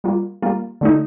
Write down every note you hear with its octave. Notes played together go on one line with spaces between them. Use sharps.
G3 A#3 F4
G3 A#3 F4
D3 A3 D#4